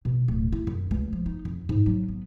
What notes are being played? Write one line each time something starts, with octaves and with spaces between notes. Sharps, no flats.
B2
D1
E4
F#2
C#2
F3
D#4
F2
G#2
F#3
B3